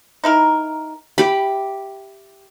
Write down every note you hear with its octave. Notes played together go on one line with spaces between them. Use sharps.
D#4 E4 A#4
E4 G4 B5